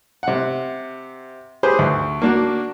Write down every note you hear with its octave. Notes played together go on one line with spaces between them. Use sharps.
C3 F#5
G4 G#4 B4 C5
D2
A#3 D4 F#4